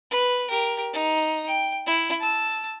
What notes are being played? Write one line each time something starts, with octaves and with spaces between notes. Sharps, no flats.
B4
G4 A#4
D#4
G5
E4
A5 E6